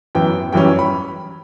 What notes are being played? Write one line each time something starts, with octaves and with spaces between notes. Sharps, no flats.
F#2 E3 B3 G5
F#2 E3 G3 C#4 G5
B5